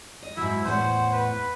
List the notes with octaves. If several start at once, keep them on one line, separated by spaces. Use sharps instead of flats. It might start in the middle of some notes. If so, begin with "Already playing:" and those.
D#5
G#2 F#3 E4
E2 A2 C5 F#5
B4